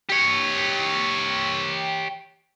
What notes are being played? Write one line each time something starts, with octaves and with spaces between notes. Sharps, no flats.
G4 C#5